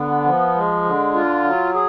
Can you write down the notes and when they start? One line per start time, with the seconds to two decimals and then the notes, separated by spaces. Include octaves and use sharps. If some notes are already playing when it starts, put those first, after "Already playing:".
Already playing: D3 B3
0.25 F3
0.55 G#3
0.84 D3
1.14 F4
1.44 F#3
1.74 G#4